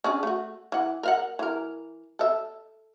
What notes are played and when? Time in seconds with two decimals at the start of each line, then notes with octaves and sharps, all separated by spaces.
0.04 C#4 D4 G#4
0.23 A3 F#4
0.72 E3 F#5
1.03 A#4 F5 F#5
1.39 E3 A#4
2.19 A4 E5